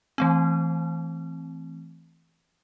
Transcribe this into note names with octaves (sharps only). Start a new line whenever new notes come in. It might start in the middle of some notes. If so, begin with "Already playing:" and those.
E3 A3 C4